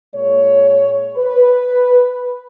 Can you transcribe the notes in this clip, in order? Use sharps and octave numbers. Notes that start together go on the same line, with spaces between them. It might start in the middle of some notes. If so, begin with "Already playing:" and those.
A#2 G#3 C#5
B4